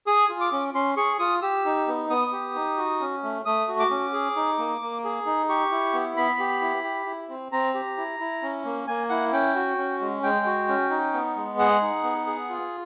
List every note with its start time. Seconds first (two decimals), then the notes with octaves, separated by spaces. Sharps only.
0.07 G#4 D#6
0.29 F4
0.41 D6
0.52 C#4
0.74 C#4 C6
0.97 G#4 C#6
1.19 F4 D#6
1.42 G4 E6
1.65 D#4
1.88 B3
2.10 B3 D#6
2.32 G4
2.55 D#4
2.78 F#4
3.00 C#4
3.23 A3
3.45 A3 D#6
3.68 F#4
3.79 D6
3.90 C#4
4.13 G#4
4.36 D#4
4.59 A#3
4.81 A#3
5.04 G#4
5.26 D#4
5.49 G4 C#6
5.72 E4
5.93 B3
6.17 B3 B5
6.39 G4
6.61 E4
6.84 G4
7.06 E4
7.29 C4
7.52 C4 A#5
7.74 G4
7.97 E4
8.20 E4
8.42 C#4
8.65 A#3
8.87 A#3 G#5
9.09 E4 F#5
9.32 C#4 G5
9.55 F#4
9.78 C#4
10.01 G#3
10.23 G#3 G5
10.46 F#4
10.68 C#4
10.90 D#4
11.14 B3
11.36 G#3
11.59 G#4 F#5
11.81 D#4
12.03 B3
12.27 G#4
12.49 F4